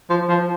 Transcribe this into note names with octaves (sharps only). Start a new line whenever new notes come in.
F3
F3